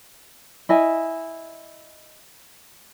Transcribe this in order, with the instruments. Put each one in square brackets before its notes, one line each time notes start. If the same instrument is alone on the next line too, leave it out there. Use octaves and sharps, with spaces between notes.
[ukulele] E4 D#5 G#5